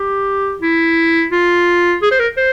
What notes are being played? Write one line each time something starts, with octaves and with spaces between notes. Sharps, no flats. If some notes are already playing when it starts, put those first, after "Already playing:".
Already playing: G4
E4
F4
G#4
C5
A#4
C5